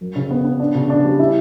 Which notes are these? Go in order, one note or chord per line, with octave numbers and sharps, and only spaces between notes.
F#2
C#3
B3
B3
D4
C#3
D4
G3
E4